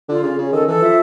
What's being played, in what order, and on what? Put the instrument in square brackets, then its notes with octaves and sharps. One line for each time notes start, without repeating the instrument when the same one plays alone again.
[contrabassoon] D3 [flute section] F4
[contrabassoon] C#3 [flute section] C#4
[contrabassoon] C#3 [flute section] C#4
[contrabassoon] D#3 [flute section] A4
[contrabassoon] E3 [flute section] A4
[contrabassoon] F3 [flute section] E5